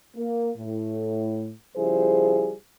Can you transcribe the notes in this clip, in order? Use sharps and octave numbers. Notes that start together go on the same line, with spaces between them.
A#3
A2
C#3 F3 G3 E4 G#4 C5